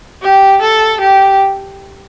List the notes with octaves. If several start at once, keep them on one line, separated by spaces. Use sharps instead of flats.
G4
A4
G4